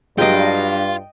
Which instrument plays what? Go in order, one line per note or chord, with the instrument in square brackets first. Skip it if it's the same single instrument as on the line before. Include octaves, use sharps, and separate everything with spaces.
[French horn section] G2 [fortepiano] F#3 G#3 [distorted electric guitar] F4 [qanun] D#5 G5